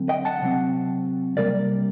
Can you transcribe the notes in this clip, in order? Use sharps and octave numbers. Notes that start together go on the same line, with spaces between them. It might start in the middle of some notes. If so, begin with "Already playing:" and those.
Already playing: D3 F#3 C4
D#5 G5
F#5 A5
C3 F#3 C4
C3 G3 A#3 A#4 D5